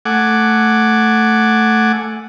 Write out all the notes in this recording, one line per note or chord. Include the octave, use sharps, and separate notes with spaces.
A3 F#5 G#5 D6